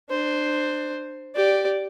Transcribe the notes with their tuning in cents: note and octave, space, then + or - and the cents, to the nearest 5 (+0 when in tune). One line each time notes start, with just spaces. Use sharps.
D4 +25 C5 +0
G4 -10 D5 +0